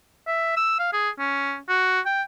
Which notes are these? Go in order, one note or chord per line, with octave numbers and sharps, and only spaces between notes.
E5
E6
F5
G#4
C#4
F#4
G5